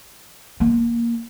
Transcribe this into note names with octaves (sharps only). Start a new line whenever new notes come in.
A#3